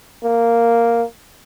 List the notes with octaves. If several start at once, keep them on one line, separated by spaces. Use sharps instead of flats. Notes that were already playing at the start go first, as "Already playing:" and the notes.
A#3